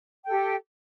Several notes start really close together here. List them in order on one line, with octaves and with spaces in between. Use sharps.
G5 A4 G4